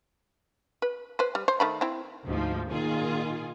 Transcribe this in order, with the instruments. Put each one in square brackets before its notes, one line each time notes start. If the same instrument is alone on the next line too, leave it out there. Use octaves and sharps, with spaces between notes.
[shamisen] B4
B4 C5
G3
C5
D#3 A3 B5
C4 E4
[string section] D2 G#2 F3
A#2 D#3 F4 G#4